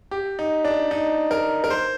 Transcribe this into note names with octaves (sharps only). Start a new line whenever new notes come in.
G4
D#4
D4
D#4
A#4
A#4
C5